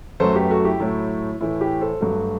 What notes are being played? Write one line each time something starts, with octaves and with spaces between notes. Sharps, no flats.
F#2 F#3 A3 A4 C5
G4 B4
F#4 A4
E4 G4
A2 F#3 A3 E4
A2 E3 A3 E4
E4 G4
A4 C5
G2 F#3 A3 F#4 A4